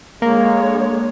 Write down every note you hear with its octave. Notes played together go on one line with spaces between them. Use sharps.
D3 G#3 A#3 C#5